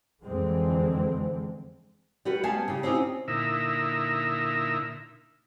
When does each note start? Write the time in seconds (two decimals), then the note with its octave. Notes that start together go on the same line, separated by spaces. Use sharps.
0.23 F2 D3 E3 G#3 C4
2.25 G3 F#4 B4
2.43 G3 B3 C#4 F5 G#5 A5
2.68 C#3 G4
2.83 C4 C#4 D#4 F4 G4
3.28 A#2 D3 D#4 E4 A#4 E5